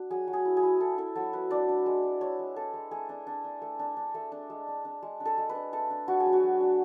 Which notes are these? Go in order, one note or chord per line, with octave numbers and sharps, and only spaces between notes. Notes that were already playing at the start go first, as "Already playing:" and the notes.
Already playing: D4 F#4
F#3 G#4
F#3
G#4
E4
G#4
E4
E4 A4
E4 A4
F#3 A4
E4 B4
D4 D5
D4
G#3
D4
D4 C#5
G#3
D4 A4
G#3
A3 G#4
D4
D4
D4
A3
D4
D4
A3
D4
G#3
D4
D4
G#3
D4
A4
G#3
B4
D4
A3 A4
D4
D4 F#4
G#4
F#3
F#4
F#3
D4